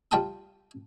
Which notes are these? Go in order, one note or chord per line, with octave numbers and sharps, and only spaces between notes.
G3 F4 G5 A5 A#5 D#6